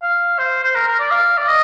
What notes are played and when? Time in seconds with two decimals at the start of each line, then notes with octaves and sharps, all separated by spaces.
0.02 F5
0.39 C5
0.63 C5
0.75 A#4
0.87 A#4
0.99 D5
1.11 F5
1.38 D5
1.48 D#5